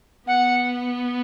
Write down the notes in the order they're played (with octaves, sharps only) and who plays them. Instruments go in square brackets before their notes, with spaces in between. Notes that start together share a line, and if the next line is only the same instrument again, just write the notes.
[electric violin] B3 [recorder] F#5